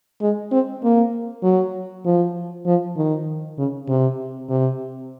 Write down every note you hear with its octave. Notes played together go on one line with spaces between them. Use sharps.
G#3
C4
A#3
F#3
F3
F3
D#3
C#3
C3
C3